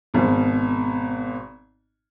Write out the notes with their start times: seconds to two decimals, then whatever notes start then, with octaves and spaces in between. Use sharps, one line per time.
0.14 G#1 B2